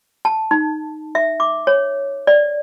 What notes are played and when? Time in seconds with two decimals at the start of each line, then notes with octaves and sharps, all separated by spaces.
0.25 A5
0.51 D#4
1.15 E5
1.40 D6
1.67 C#5
2.27 D5